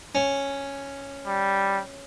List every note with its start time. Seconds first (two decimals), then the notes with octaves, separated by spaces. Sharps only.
0.15 C#4
1.26 G3